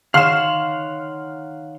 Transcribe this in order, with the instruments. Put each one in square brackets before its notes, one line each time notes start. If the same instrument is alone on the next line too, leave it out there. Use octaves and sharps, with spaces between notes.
[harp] D#3 C#5 [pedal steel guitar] F5 F#5 C6 [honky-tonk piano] F6 E7